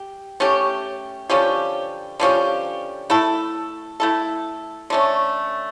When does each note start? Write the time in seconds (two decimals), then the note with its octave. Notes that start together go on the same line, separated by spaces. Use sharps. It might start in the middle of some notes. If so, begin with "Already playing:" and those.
Already playing: G4
0.40 A3 C#4 G4
1.30 D3 F3 C#4 G4
2.20 D3 F3 C#4 G4
3.10 A3 E4 A4
4.00 A3 E4 A4
4.90 D3 A3 C#4